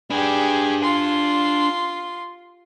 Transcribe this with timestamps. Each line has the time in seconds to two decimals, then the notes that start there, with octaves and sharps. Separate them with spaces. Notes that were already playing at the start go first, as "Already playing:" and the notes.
0.10 D4 G4 G#4 B4
0.84 F4 C6